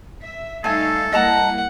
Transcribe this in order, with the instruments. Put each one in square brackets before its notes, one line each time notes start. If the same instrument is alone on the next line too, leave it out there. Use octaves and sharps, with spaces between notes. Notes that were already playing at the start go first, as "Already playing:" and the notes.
[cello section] E5
[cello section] G3 D#4 F5 [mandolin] A3 G#5 [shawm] A4
[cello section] G3 A#3 E4 [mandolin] D#5 A5 A#5 [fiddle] F#5